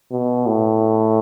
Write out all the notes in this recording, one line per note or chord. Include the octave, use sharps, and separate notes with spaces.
B2
A2